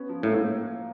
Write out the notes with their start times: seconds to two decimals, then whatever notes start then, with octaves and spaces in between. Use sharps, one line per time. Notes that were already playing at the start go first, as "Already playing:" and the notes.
Already playing: B3 C#4
0.09 F3
0.23 A2 A#3